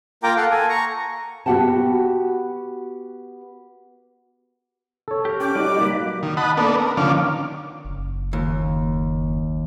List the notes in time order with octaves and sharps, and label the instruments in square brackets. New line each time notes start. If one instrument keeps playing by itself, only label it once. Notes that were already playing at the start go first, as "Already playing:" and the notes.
[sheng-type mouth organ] A#3 F4 A#4 G5 A#5 D6
A4 F5 F#5
A4 G#5
A#5 C#6
[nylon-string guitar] B3 F#4 G4 F#5 G5 A5
[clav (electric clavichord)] A4 C#5
[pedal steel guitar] G4 A#4
[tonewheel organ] C#4 G5 [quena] D6
[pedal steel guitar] F#3 B4 D5 [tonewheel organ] G3 D#4 F#4
[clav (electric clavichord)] A#3 [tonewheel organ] B5
[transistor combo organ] D#3
D#5 F#5 A5 B5
A#3 B3 D4 A4
A#4
D3 D#3 F3 C#4 F5 D6
[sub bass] F#1
[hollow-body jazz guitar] D#2